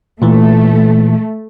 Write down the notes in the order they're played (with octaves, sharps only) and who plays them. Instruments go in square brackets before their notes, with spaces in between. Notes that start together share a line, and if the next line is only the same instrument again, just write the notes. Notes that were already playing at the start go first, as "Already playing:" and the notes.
[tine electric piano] A#2 E3 [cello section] A3